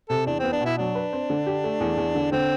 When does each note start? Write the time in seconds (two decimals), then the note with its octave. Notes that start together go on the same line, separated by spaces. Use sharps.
0.10 C3 A4
0.27 E2 D4
0.39 B3 C4
0.52 D4
0.61 B2 E4
0.78 F#3 D4
0.95 B4
1.13 C4
1.30 D3
1.46 G4
1.64 A3
1.80 E2
1.97 E2
2.15 D3
2.32 D3 C4